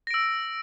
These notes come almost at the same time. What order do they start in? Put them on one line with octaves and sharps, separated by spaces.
A#6 D7 E6